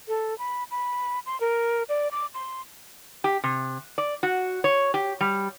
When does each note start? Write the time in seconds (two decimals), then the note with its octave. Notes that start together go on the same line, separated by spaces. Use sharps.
0.08 A4
0.38 B5
0.71 B5
1.26 C6
1.40 A#4
1.89 D5
2.11 D6
2.34 C6
3.24 G4
3.44 C3
3.98 D5
4.23 F#4
4.64 C#5
4.94 G4
5.21 G3